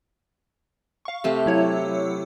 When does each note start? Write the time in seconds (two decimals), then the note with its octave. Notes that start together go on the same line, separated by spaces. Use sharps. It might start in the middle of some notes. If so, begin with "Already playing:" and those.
1.05 F5 C#6
1.24 C3 A3 G4
1.46 F#3 E4 C#5